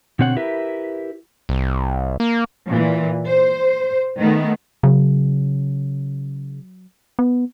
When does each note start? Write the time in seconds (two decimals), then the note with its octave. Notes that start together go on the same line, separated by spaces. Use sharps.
0.19 B2 D3 C4 C#5 F#5
0.36 E4 G4 A#4 B4 E5
1.49 C2
2.20 A#3
2.69 A#2 E3
3.27 C5
4.19 D#3 A3 B3
4.83 C#3 F#3
7.19 B3